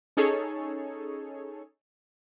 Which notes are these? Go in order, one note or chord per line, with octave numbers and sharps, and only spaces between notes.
C#4 D#4 G#4 A4 C#5